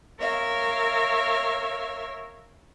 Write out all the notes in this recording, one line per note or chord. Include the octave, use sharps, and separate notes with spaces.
A#4 C#5 E5 F5